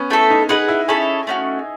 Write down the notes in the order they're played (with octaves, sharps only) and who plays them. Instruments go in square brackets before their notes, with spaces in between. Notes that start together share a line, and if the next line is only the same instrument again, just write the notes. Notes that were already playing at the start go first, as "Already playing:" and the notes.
Already playing: [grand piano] B3 C#4
[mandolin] A3 E4 A4 E5
[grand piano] D#4
[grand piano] D#4 [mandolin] G#4 B4 F#5
[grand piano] E4
[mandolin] C#4 E4 A4 C#5 [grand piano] G#4
[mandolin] A3 C#4 F#4